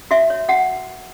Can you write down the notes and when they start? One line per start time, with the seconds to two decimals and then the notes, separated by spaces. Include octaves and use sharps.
0.11 F#4 E5
0.30 C#5
0.48 F#4 F#5